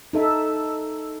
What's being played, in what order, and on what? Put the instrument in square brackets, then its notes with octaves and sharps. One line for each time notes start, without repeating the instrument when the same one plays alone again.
[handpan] D#4 A4 E5